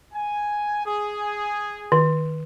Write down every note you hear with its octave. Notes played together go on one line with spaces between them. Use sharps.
G#5
G#4
D#3